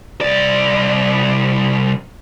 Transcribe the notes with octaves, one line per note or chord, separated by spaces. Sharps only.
C2 D5